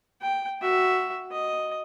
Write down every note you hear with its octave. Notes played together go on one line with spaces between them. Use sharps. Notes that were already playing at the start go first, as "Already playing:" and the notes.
G5
F#4 E5
D#5